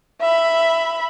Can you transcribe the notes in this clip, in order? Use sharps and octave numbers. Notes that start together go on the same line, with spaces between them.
E5 B5